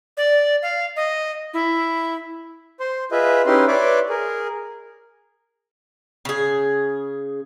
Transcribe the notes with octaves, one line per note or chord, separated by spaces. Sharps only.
D5
F5
D#5
E4
C5 C6
F4 G#4 B4 D#5 E5
C#4 D#4 E4 G4 B4 C6
B4 C#5 D5 E5 C6 D6
G#4 A#4
C#3 G#4